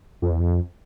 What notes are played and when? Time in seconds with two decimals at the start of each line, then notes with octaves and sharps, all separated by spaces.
0.22 F2
0.31 E2
0.40 F2